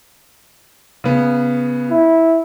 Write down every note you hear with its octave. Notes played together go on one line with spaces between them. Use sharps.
C#3 B3
E4